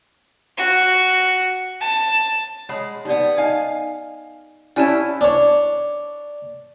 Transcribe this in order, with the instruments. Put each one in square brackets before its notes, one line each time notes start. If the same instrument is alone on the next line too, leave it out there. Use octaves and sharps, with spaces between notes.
[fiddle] F#4
A5
[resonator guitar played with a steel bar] G#3 [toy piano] C#5 F#5 B5
[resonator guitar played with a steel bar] G3 B3 [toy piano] D#4 D5
[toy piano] D#4 D#5 [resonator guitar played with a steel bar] F5 G#5
[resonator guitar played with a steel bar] C#4 G4 [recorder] E4 [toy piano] C#5 F#5 [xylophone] D5 G#5 A5
[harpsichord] D4 C#5